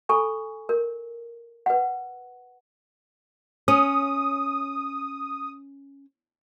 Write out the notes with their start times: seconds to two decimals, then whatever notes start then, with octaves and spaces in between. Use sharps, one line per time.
0.09 A4 G#5 B5 C#6
0.69 A#4
1.66 B4 F#5
3.68 C#4 D#6